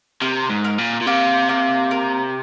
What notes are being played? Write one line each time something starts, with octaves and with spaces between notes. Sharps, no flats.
C3 A#4
G#2
A#4
A#2
A#2
C3 A#3
A#3
A#4